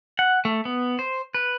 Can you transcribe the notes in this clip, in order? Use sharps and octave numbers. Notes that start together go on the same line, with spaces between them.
F#5
A3
B3
C5
B4